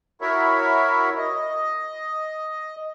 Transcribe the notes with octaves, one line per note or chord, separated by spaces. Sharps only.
E4 F#4 A#4 C#5 E5
D#5